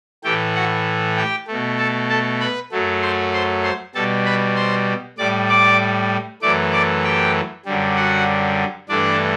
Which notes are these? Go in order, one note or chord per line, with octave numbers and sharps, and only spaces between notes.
A2 E3 A3 G4 G5
F#4 F#5
G4 G5
B2 A3
A4 A5
A4 A5
B4 B5
F#2 F#3 A3
C5 C6
C5 C6
C5 C6
B2 G3 A4 A5
B4 B5
C5 C6
A2 G3 D5 D6
D5 D6
F#2 E3 A3 D5 D6
D5 D6
G4 G5
F#2 D3 G3
F#4 F#5
G2 E3 A3 D4 D5